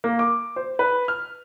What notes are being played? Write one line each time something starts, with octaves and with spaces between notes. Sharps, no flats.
A#3
D6
C5
B4
F6